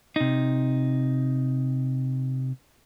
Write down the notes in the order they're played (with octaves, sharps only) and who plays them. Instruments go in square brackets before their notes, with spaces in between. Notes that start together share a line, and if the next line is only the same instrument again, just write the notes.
[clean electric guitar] C3 D#4